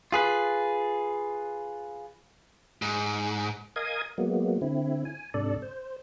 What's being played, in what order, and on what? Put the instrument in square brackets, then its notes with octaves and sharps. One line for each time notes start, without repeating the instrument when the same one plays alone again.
[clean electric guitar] F4 G#4 B4
[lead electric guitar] G#2
[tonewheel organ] A#4 D#5 F5 G#5 D#6 G#6
F#3 G#3 A#3 B3
D3 C4 E4
G#5
G#2 C3 D4 A4 D5
C5